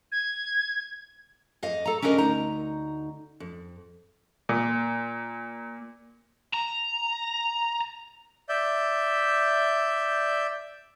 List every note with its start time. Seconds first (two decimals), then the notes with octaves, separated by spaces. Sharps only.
0.12 G#6
1.63 F2 D#5 F5
1.86 A4 A#5
2.02 C#4 D4 E4 A#4 D#5 F5
2.18 D2 D#4 A#5
3.40 F2
4.49 A#2
6.53 A#5
8.49 D5 E5 G6